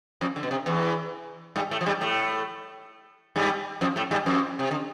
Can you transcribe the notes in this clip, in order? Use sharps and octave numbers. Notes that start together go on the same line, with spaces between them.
F2 F3
D3
B2
C3
E2 E3
G2 G3
A2 A3
F3
G2 G3
A2 A3
G2 G3
F2 F3
A2 A3
G2 G3
F2 F3
C3
D3